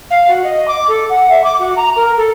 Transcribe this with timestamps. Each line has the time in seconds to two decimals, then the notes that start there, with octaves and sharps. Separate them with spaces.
0.10 F5
0.28 F#4
0.43 D#5
0.67 D6
0.88 A4
1.09 F#5
1.29 E5
1.43 D6
1.59 F#4
1.76 A#5
1.96 A#4
2.16 A4